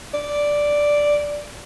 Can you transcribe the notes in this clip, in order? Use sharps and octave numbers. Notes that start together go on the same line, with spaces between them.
D5